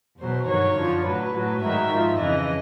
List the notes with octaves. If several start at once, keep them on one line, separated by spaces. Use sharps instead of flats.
E2 B2 F#3 C5
G2 D#3 F#3 C#5
F#2 D3 F3
A2 F#3 B4
A2 F#3
G#2 D#3 F#3 E5
G#2 F3
F2 C#3 E3 D#5